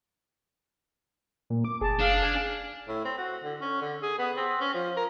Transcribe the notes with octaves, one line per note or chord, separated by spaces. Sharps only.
A#2
D6
F#1 G#4 A5
D4 F5
G#5
A2
C4
F#4
D3
C#4
D3
G#4
B3
C4
C#4
F3
A#4